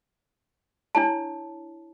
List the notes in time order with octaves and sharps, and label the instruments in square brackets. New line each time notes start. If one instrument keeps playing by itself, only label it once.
[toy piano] D4 E4 C#5 A5